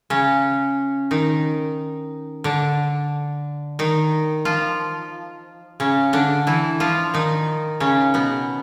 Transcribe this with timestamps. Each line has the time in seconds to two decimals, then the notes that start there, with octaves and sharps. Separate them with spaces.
0.10 C#3 C#4
1.11 D#3 D#4
2.44 D3 D4
3.79 D#3 D#4
4.45 F3 F4
5.80 C#3 C#4
6.13 D3 D4
6.47 E3 E4
6.80 F3 F4
7.14 D#3 D#4
7.80 C#3 C#4
8.14 B2 B3